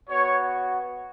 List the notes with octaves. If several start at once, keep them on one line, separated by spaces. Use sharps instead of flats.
B3 F#4 C#5